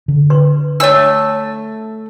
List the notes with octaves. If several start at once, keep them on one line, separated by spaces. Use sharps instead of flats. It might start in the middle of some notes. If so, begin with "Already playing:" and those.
D3
B4 C6
A3 D4 C#5 E6